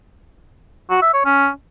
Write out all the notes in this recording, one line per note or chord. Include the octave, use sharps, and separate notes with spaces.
F#4
E5
C#5
C#4